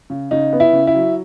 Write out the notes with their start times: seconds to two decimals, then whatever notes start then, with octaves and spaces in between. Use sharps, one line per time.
0.10 C#3
0.31 C#3 D#4
0.53 B3
0.60 E4
0.73 C#3
0.87 E4
0.95 F#3